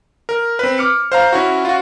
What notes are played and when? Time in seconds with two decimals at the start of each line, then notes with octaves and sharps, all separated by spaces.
0.29 A#4
0.59 C4 B4
0.78 D6 F6 C#7
1.12 C5 F5 A#5
1.33 C#4 E4 F#4
1.65 F4 F#4